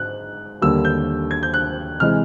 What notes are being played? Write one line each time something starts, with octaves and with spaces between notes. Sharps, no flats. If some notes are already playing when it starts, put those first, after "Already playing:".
Already playing: G#2 F#6
D#2 D3 G3 A#3 E6
G6
G#6
G6
F#6
C3 E3 G#3 F6